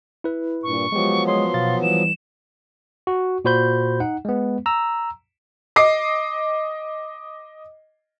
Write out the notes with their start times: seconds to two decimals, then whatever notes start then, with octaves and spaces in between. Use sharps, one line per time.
0.24 E4 B4
0.63 G2 A#2 C#6
0.92 F3 F#3 G#3 B3 G4
1.27 G#3 C#5 C6 D#6
1.54 B2 F5 A6
1.82 E3 G3 E7
3.07 F#4
3.45 A#2 F#4 C5 B5 G6
4.00 D#4 F#5
4.25 G#3 B3
4.66 A#5 E6
5.76 D#5 D6 C7